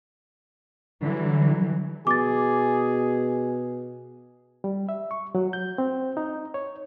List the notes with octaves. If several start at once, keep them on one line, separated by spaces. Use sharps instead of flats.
D3 E3 F#3 G3
B2 G#4 D6 A6
G3
E5
C#6
F#3
G6
C4
D#4
C#5